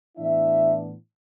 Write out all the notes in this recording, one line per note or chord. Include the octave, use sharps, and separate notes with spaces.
A2 E3 B3 D4 E4 E5